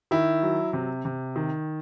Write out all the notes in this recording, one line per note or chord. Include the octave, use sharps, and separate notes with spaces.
D#3 E4
F#3
C3
C3
D#3